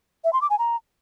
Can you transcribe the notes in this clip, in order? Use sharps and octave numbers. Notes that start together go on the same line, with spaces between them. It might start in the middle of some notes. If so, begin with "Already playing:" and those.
E5
C6
D6
G#5
A#5